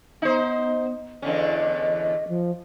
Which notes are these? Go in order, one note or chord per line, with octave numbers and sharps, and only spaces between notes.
B3 D#4 C5
E2 D3 C#4 D#5
F3